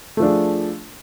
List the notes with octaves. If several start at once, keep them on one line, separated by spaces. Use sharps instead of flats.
F3 A3 D4 G#4